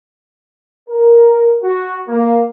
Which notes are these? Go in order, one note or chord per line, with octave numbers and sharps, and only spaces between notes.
A#4
F#4
A#3